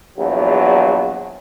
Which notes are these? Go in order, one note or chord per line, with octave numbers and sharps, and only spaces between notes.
A#1 E2 F#3